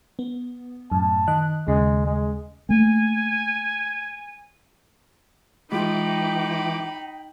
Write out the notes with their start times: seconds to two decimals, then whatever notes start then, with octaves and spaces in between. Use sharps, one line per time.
0.19 B3
0.92 F#2 A2 A5
1.28 D#3 D#5 F#6
1.68 D#2 C#3 G#3
2.06 G#3
2.69 A3 A#3 G#5
5.72 E3 G#3 D#4 F4 G5 B5 D6